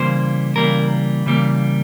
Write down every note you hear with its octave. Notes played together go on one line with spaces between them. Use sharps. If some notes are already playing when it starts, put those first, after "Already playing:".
Already playing: C#3 E3 G3 A#3 C5
C#3 E3 G3 A#3 A#4
C#3 E3 G3 A#3